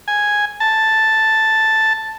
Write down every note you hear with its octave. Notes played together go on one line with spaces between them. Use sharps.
G#5
A5